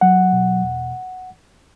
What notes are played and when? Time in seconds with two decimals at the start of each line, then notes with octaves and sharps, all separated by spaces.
0.01 F#3 F#5
0.33 B2
0.63 E2